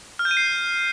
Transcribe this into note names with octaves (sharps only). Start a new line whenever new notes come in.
F6
G6
D#7
C7